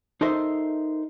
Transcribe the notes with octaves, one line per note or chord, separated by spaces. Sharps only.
D#4 A4 A#4 C5 D#5 E5